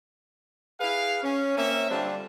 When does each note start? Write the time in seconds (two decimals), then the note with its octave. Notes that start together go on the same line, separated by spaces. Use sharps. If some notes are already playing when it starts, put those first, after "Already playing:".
0.80 E4 G#4 B4 F5
1.23 C#4
1.57 A#3 C4 C#4 E5
1.90 D3 G3 C4 D4 F4